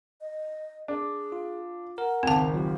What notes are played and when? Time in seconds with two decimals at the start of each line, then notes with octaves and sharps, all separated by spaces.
0.21 D#5
0.88 D4 G#4
1.32 F4
1.98 A#4 F#5
2.23 G#1 C#2 C4 A5
2.54 F#3 F4 G4